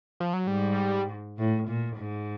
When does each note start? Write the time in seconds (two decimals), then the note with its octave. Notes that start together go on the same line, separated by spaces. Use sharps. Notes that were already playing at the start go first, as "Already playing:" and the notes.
0.20 F3
0.33 F#3
0.47 G#2 G3
1.38 A2
1.68 A#2
1.97 G#2